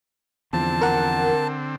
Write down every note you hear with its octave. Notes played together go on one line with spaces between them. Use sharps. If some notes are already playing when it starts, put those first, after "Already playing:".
E2 D3 F3 C4 A5
A#4 F#5